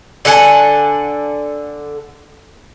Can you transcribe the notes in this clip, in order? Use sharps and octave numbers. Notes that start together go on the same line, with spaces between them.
D3 A4 F#5 G#5